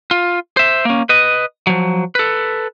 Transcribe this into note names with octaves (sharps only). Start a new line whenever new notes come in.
F4
C5 E5
A#3 C#4
B4 D#5
F3 F#3
A4 B4